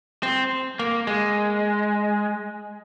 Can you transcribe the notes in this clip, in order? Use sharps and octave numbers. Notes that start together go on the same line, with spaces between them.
C4
A#3
G#3